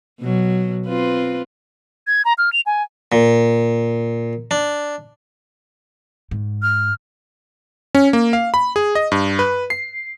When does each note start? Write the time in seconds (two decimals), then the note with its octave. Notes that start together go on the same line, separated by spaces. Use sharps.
0.21 B2 F#3
0.87 C4 F4 B4
2.07 G#6
2.25 A#5
2.38 F6
2.53 F7
2.66 G#5
3.12 A#2
4.51 D4
6.31 G#2
6.62 F6
7.95 C#4
8.13 A#3
8.33 F5
8.54 B5
8.76 G#4
8.95 D#5
9.12 G2
9.39 B4
9.70 C7